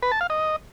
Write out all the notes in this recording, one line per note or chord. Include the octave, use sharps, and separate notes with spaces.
B4
A5
F5
D#5